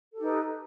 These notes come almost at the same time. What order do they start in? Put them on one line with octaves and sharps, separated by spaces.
A4 G4 D#4 B4